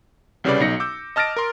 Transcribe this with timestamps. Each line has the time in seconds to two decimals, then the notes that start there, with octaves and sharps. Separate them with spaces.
0.44 C2 C#3 G3 C#4 B4 D5
0.60 B1 D#4 A#6 C#7
0.80 D6 E6 G6
1.16 D#5 A5 F6 A6 A#6 D7
1.36 A#4 C6